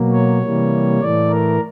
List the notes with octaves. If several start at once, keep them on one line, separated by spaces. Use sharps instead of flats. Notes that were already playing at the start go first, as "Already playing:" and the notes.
Already playing: B2 F#3 A#3
C#5
C3 E3 G3 A#3
A2 E3 A3 D5
A#4